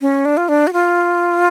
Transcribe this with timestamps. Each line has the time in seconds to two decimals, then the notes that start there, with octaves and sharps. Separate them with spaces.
0.01 C#4
0.25 D4
0.37 F4
0.49 D4
0.67 F#4
0.73 F4